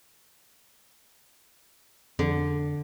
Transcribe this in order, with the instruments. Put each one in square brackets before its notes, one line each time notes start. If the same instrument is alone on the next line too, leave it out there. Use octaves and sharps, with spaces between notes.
[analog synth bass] F2 [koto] D3